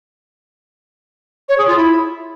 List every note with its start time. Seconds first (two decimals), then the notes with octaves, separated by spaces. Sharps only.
1.49 C#5
1.58 G#4
1.67 F4
1.77 E4